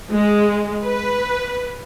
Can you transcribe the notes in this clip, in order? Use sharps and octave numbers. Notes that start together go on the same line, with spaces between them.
G#3
B4